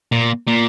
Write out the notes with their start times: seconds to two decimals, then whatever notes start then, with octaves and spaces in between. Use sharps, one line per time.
0.12 A#2
0.48 A#2